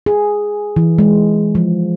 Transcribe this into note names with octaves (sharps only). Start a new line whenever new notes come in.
G#4
E3
G#3
F3